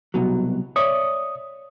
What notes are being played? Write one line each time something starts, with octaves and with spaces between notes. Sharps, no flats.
C2 B2 F#3
C#5 D5 E5 D#6